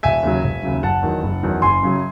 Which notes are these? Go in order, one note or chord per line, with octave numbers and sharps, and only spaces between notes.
E1 E5 G#5
D#2 C#3 F#3
E1
D#2 C#3 F#3
F#1 F#5 A5
E2 D#3 F#3
F#1
E2 D#3 F#3
F#1 G#5 C6
F#2 C#3 F#3